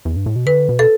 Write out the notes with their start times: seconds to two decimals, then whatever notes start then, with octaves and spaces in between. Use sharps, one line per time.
0.05 E2
0.16 G2
0.26 A2
0.36 B2
0.46 D3 B4
0.69 B2
0.79 A4